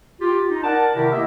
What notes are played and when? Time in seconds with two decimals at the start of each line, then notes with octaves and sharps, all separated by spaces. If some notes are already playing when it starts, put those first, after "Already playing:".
0.21 F4 G4
0.50 D#4
0.63 A#4 D5 F#5 A5
0.94 C3 D#3 E4 G4 A#4
1.11 A#3 B3 E4 D#5 E5